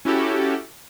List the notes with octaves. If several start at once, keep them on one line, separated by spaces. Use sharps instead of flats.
C#4 E4 F#4 G4 A4